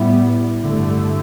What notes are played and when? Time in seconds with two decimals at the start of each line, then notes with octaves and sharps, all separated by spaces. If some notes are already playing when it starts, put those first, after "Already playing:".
Already playing: A2 G3 B3 E4
0.63 G2 D3 A3